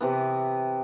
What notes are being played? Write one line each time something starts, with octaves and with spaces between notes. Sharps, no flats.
C3 E3 B3